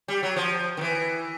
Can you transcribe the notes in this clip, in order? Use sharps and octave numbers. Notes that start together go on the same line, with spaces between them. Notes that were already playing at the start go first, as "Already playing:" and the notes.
G3
F#3
F3
D#3
E3